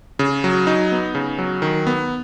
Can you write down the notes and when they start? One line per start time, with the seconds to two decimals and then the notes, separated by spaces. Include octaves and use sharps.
0.19 C#3
0.44 F#3
0.67 D#4
0.92 B3
1.15 C#3
1.38 F#3
1.62 D#3
1.87 B3